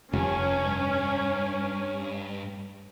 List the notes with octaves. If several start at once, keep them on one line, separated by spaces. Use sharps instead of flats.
F1 G2 C#4